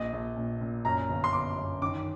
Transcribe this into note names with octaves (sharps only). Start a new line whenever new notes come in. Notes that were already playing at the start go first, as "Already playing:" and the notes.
Already playing: A#1 D#5
A#1
A#2
A#2
F#2 A#5
G1
C6
G1 D6
F#2
D#3 D6